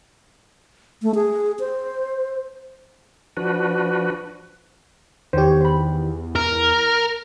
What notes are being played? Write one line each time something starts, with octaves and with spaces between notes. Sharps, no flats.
A3
G#4
C5
F3 D4 F#4 B4
E2 D#3 G4 C5 C#5
C5 B5
A#4 F6